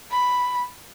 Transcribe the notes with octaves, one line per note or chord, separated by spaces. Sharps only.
B5